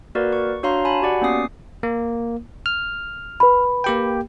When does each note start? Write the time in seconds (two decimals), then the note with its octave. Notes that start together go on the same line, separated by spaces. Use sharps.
0.15 A#3 F#4 A#4 B4 D5
0.33 C#6
0.63 D4 F#4 C#5 F5 A#5 C6
0.85 G#5 A5 B5
1.02 F#4 G4 D5 F#5
1.21 A#3 B3 C#4 D6 D#6 C7
1.83 A#3
2.66 F6
3.40 B4 B5
3.84 A#3 G4 G5